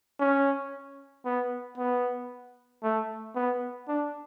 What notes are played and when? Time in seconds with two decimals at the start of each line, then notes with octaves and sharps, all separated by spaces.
0.20 C#4
1.25 B3
1.78 B3
2.83 A3
3.36 B3
3.88 D4